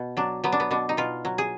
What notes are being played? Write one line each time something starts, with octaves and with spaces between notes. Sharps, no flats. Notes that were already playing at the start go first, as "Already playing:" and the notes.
Already playing: B2
F#3 D4
F#3 B3
D4
B3
B2 D4
D#4
B2 F4
F#3
G#4